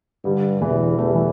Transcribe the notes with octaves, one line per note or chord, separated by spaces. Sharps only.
G2 D3 G3
E2 B2 E3
E2 A3
G3
E3